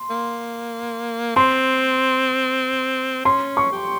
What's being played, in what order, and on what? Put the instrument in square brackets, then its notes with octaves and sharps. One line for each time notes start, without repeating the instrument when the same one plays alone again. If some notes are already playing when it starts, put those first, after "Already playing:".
Already playing: [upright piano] C6
[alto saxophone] A#3
[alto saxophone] C4 [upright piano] C6
[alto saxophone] C#4 [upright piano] C6
[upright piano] C#6
[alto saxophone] G4